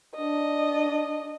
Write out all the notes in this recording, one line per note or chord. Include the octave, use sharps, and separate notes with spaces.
D4 D#5